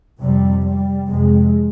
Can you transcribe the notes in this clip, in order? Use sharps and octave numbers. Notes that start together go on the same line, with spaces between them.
F2 C3 G3
G3
F2 C3 G#3